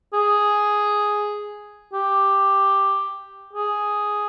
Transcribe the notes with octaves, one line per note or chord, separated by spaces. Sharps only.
G#4
G4
G#4